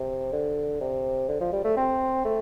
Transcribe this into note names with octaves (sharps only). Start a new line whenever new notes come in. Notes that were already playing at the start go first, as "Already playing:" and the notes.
Already playing: C3
D3
C3
D3
F3
G3
A3
C4
A3